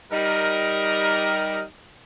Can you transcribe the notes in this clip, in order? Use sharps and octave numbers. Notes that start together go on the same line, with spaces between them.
G3 D#4 A#4